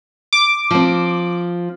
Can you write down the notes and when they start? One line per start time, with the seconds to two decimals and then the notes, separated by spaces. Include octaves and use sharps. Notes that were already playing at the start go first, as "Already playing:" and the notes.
0.33 D6
0.71 F3 C4